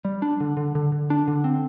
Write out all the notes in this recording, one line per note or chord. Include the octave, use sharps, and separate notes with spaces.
G3
D4
D3
D3
D3
D3
D4
D3
C4